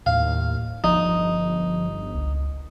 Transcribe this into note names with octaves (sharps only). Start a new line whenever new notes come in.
D#2 A2 F5
G1 F3 D#4
C#2